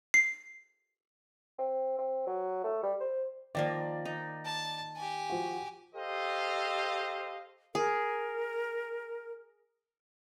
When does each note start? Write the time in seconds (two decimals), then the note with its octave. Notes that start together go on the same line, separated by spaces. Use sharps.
0.14 C7
1.59 C4
1.99 C4
2.27 F#3
2.64 A3
2.83 G3
3.00 C5
3.55 D#3 F3 A#3 D5
4.05 D#4
4.45 A5
4.96 G4 G#5
5.30 F3 F#4
5.95 G4 A4 C5 D#5 F5
7.75 G#4 A#4